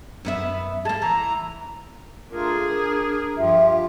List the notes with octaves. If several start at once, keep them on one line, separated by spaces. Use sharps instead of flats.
F#2 B3 E5
G#3 A#3 A5
E3 A#5
A3 D4 F4 G#4 A#4
A#4
G2 F3 F4 G4 E5